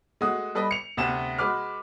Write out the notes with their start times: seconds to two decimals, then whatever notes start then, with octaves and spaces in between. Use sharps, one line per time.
0.21 G#3 A3 F#4 D#6
0.55 G3 A4 B4 D#5
0.71 C#7 F7
0.97 D2 C3 B3 E7
1.39 G#3 F#4 B4 D6 F6